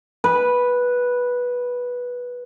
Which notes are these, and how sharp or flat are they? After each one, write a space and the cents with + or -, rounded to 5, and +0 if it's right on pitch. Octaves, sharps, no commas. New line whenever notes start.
B4 -10